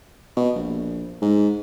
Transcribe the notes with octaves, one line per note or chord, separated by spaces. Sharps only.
B2
A#1
G#2